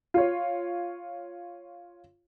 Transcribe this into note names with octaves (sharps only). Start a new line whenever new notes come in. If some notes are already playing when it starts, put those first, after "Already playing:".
F4 C#5